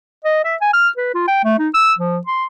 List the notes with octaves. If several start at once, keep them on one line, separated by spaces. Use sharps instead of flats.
D#5
E5
G#5
F6
B4
F4
G5
A3
D#4
E6
F3
C6